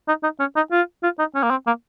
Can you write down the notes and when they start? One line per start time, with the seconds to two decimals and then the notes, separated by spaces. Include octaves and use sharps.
0.08 D#4
0.23 D#4
0.40 C#4
0.56 D#4
0.72 F4
1.03 F4
1.19 D#4
1.35 C#4
1.43 A#3
1.50 C4
1.67 A#3